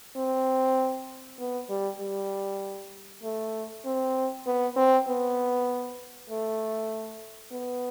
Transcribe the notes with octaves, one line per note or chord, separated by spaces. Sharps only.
C4
B3
G3
G3
A3
C4
B3
C4
B3
A3
B3